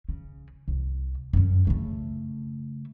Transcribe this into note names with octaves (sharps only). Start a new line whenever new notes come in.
C#3
C2
F#2 C#4
C#3 A3